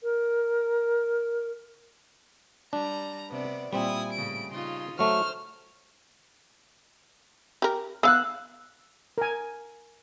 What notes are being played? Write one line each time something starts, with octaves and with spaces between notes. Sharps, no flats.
A#4
G3 D4 A#5
C3 B3 D5
A#2 G3 C4 E4 G#5 D#6
A2 C#3 D7
C#3 D#4 F4 C6
F#3 A3 C5 C#6 F6
G4 A#4
B3 F5 E6 F#6
A#4 G#5